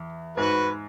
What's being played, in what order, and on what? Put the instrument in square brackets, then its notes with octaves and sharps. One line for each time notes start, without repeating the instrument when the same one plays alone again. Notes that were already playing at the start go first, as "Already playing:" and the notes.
Already playing: [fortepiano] E2
[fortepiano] G#2 [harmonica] F#4 B4